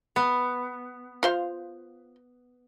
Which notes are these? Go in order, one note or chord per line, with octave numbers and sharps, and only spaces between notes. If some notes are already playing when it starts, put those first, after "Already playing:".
B3
F4 C5 F5